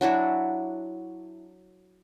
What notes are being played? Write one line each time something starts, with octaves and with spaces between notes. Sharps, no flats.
F#3 D4 E4 F#4